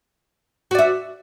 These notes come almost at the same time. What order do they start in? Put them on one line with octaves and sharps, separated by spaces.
F#4 D5 E5